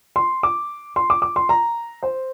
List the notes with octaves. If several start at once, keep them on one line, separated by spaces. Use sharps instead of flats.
C6
D6
C6
D6
D6
C6
A#5
C5